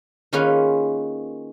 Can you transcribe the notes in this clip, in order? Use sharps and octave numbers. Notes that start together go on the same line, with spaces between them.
D#3 A#3 C#4 F4 G#4 B4